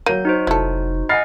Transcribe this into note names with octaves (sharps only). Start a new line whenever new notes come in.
F#3 A#3 G6 D#7
D#4 F#4 C5
F1 E4 A4
D#5 F#5 G#5 F6 A6 C7